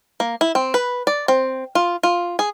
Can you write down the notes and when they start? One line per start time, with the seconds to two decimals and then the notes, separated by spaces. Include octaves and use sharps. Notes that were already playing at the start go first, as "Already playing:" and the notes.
0.20 A#3
0.41 E4
0.55 C4
0.74 B4
1.07 D5
1.28 C4
1.75 F4
2.03 F4
2.39 G#4